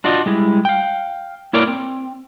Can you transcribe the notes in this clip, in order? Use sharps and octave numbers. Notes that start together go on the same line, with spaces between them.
D4 F4 F#4 D5 D#5
G3 G#3 E4
F5 G5
A#3 E4 A#4 C#5 D5
C4